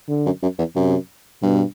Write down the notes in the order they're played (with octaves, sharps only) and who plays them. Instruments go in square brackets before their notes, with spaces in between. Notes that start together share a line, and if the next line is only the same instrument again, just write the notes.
[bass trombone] D3
[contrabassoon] F#2
F#2
E2
[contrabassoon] F#2 [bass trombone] C3
[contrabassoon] G2 [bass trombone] B2